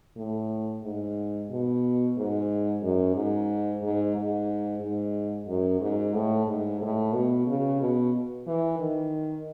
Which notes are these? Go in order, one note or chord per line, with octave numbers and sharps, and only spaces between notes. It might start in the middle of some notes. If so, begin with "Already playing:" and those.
A2
G#2
B2
G#2
F#2
G#2
G#2
G#2
G#2
F#2
G#2
A2
G#2
A2
B2
C#3
B2
E3
D#3